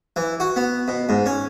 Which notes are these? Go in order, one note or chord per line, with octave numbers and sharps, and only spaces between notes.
E3
F#4
B3
B2
G#2
C#4